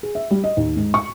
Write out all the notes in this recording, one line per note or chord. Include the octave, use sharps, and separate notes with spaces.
G#4
E5
G3
D#5
D#2
G#2
C#6